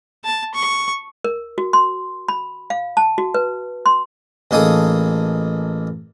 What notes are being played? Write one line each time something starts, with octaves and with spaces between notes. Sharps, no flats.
A5
C#6
A#4
F#4
C6
B5
F5
A5
F#4
B4
C6
A1 A#3 D#4 G#4 A4 D#6